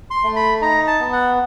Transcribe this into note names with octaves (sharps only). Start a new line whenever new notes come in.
C6
A3
B5
D#4 A#5
A5
B3
F#5